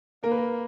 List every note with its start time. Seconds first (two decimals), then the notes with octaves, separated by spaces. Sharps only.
0.24 A#3 A#4
0.31 B4
0.37 A#4